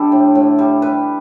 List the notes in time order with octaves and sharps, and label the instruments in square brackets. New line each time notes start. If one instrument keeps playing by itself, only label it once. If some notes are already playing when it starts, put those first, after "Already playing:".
Already playing: [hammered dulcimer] D3 G3 D4 E4 G4 A4
A2
A2
G3
G3 B4